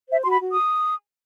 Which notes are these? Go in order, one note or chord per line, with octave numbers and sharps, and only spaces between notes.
C5 E5
C6
F#4 B5
F#4
D#6